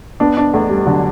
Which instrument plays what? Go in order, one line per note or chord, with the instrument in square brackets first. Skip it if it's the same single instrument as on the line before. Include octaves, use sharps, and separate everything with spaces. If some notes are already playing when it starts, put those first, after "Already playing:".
[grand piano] B3 [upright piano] D4
[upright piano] D4
[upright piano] E2 [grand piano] A3
[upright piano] G3
[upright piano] D3 [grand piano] F#3